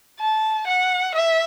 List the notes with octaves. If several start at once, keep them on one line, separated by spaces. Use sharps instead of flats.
A5
F#5
E5